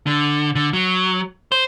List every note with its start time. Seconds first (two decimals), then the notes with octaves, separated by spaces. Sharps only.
0.07 D3
0.55 D3
0.73 F#3
1.52 C5